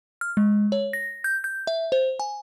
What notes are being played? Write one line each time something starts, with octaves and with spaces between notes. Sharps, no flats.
F6
G#3
C#5
A#6
G6
G6
E5
C5
G#5